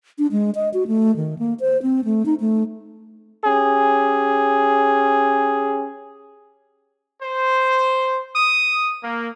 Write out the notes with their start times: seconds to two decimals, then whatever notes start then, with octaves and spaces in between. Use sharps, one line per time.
0.18 D4
0.32 G#3
0.55 D#5
0.74 F#4
0.87 A3
1.16 D#3
1.39 A#3
1.60 C5
1.82 C4
2.05 A3
2.26 D#4
2.40 A3
3.45 C#4 G4 G#4
7.23 C5
8.36 D#6
9.03 A#3